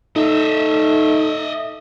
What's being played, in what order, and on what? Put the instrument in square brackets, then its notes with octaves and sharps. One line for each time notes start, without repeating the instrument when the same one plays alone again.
[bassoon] A3 [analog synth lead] D#4 [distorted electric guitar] D#5 E5